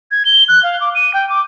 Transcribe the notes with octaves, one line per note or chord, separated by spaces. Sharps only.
G#6
G7
F#6
F5
D6
D#7
G5
D6